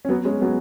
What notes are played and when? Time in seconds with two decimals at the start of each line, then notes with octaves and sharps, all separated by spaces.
0.05 C#4
0.09 F#3 B3
0.25 G#3 C#4
0.42 F#3 B3